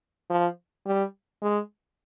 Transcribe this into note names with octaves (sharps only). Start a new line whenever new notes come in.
F3
G3
G#3